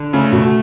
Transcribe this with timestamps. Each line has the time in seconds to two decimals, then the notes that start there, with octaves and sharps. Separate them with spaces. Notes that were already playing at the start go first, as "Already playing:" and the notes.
Already playing: D3
0.13 C#3 A3
0.32 B2